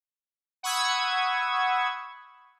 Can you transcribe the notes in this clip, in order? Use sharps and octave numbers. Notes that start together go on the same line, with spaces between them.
F#5 B5 C#6 D#6 E6 G#6